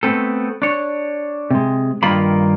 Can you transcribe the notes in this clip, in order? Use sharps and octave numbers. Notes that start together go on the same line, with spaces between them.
A3 B3 C4 A4
D4 C#5
C3 G#3
G2 D#3 A#3 D#4 F4 B5